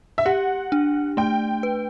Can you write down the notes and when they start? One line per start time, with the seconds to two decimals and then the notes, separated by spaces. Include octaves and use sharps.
0.18 E5
0.26 G4 F#5
0.72 D4
1.17 A3 G5
1.63 B4